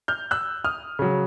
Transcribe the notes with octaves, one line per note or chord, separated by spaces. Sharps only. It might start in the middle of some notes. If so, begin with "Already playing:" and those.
F6 G6
E6 F#6
D#6 F6
C#3 F#3